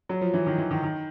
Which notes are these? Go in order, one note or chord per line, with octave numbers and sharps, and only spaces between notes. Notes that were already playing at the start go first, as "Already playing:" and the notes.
F#3
F3
E3
D#3
E3
D#3
D#3